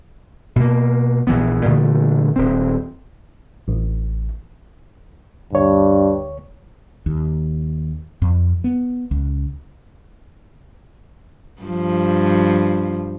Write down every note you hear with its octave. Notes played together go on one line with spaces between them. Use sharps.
B2 A#3
A#1 E3 B3
A#2 D3 E3 A3
D#1 C4
A1
D2 G2 C#5
D#2
F2
B3
C#2
G2 F3